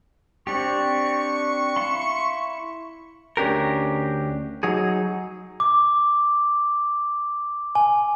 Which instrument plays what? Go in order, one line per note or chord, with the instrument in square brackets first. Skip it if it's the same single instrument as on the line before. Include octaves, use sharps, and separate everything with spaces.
[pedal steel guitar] C4 D4 G4 [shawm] C#6
[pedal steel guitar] E4 F5 C6
[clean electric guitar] D2 C#4 D4 G4 A#4
F#3 D#4 G#4
[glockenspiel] D6
G#5